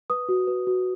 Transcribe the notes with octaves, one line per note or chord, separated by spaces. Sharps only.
B4 D#6
F#4
B4
F#4